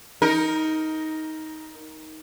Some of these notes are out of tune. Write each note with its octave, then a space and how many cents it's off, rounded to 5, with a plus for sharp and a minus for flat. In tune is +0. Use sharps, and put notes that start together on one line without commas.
D#4 +15 A#4 +0